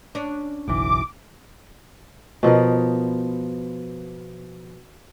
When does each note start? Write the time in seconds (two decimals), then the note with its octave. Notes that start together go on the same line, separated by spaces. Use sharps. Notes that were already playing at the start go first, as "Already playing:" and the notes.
0.15 C#4 D4
0.68 F#1 B1 E3 D6
2.43 B2 F3 B3 A#4